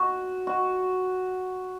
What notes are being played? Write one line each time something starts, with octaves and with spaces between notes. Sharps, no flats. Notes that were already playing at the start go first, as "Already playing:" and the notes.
Already playing: F#4
F#4